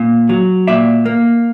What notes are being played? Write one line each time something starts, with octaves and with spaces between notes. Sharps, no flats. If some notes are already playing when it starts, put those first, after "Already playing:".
Already playing: A#2
F#3
A#2 D5 E5
A#3